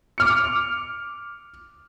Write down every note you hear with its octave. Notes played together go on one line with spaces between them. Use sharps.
D6 F6 C#7